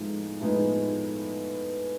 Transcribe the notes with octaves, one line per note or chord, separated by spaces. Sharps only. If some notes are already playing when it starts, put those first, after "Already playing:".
Already playing: A2 F3 G#3 B3 D#4
A2 F3 G#3 B3 D#4